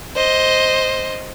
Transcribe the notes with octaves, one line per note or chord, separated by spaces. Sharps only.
C5 D#5